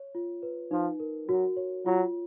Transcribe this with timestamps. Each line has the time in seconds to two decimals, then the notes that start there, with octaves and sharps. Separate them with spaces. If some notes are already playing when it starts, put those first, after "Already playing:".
Already playing: C#5
0.15 F4
0.43 B4
0.71 F3 D#4
1.00 A#4
1.28 F#3 F#4
1.57 C#5
1.86 F#3 F4